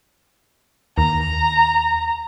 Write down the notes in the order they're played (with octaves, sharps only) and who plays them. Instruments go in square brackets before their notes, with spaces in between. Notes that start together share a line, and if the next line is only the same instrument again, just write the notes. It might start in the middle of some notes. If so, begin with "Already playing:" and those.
[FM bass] D#2 [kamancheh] A#5